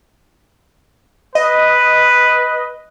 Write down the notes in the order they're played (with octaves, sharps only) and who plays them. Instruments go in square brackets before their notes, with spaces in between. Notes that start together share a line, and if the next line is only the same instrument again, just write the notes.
[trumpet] B4 [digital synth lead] D#5